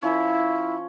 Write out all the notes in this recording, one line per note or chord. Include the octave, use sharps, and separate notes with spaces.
F3 C#4 E4